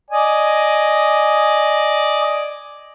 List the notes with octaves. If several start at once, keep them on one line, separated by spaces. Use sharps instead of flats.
D5 D#5 G#5